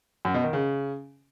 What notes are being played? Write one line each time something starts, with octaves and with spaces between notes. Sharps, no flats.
F#2
B2
D#3
C#3